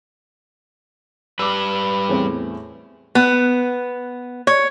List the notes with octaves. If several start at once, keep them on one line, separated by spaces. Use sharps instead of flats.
G3 B4 D6 E6
E2 A2 C4
B3
C#5